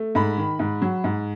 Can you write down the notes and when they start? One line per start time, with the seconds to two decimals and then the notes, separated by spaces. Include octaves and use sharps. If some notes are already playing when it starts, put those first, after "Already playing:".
Already playing: A3
0.15 G#2 B5
0.37 D#3
0.59 G#2
0.82 F#3
1.04 G#2